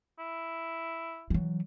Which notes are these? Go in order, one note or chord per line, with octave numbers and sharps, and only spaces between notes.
E4
E3 F#3